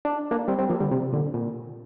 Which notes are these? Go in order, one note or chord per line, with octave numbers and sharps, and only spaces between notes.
D4
A#3 D4
G3 C4
G3 C4
F3 A#3
D3 G3
C3
A#2 D3
A#2